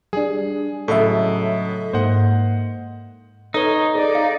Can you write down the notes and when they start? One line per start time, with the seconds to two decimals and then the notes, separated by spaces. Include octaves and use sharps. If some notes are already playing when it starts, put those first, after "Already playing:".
0.13 G3 D4 G#4
0.88 A2 C#3 F#3 A4 D#5 E5
1.93 G#2 A#3 C5 D#5 F#5
3.54 D#4 A4 B4 C#5 G7
3.95 G#4 A4 D5
4.15 F5